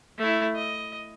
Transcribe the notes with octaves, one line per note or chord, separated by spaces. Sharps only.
A3 E4
D#5